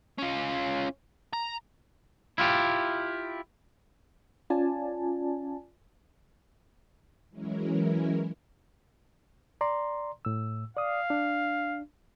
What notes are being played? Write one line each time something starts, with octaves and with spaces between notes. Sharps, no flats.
C#4 F4
A#5
E4 F4 G4
C#4 F4 D5 G#5 A5
E3 F#3 G#3 C#4 E4 A#4
D5 A#5 C6
A2 E6
D5 F5 D#6
D4